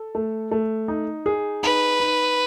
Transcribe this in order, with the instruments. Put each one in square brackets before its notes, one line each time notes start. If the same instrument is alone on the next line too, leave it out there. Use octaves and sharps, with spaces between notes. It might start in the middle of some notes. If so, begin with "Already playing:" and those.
Already playing: [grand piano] A4
A3
A3
D#4
G#4
[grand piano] D#4 [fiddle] B4
[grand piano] D#4